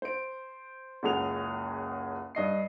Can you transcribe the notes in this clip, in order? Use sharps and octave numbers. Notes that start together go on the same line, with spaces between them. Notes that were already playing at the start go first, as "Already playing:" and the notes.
C5 D7
F#1 C#2 F#4 G#4 F7
G2 D#5 C7